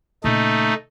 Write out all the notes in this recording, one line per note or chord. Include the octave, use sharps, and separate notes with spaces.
A#2 C#3 A3 D#4